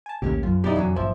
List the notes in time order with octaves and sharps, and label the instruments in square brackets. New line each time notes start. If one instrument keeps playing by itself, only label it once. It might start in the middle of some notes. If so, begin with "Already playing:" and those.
[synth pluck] G#5 A5
[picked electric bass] A#1 D#3 [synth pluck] D#2 A2 C3 [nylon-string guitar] A#3 C#4 G4
[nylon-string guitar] F#2 [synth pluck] F4
[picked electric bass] F1 [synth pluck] B2 D5 D#6 [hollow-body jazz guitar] D#4 E4 G4
[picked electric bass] F1 [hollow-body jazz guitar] E3 F#3 C#4
[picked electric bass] G#1 G2 A#2 [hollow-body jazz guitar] F3 E5